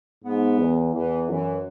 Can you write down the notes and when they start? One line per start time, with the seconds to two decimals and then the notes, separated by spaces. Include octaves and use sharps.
0.24 G#2 B3
0.59 E2
0.94 E2 E3
1.29 F#2 E3